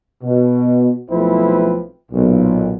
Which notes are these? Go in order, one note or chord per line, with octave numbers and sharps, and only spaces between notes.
B2
B1 F3 A3 C4 E4 B4
B1 A#2